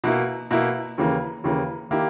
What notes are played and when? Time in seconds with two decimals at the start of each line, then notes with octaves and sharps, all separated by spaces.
0.04 B2 A#3 E4
0.51 B2 A#3 E4
0.98 D#2 C#3 E3 A#3
1.44 D#2 C#3 E3 A#3
1.91 D#3 A#3 E4 G4